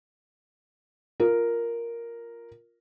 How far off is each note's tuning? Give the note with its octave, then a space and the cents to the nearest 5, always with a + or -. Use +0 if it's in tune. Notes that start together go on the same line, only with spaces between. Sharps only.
F4 +0 A#4 +0